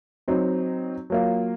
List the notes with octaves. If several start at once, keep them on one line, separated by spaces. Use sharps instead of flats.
F#3 C4 D#4
F#3 A#3 F4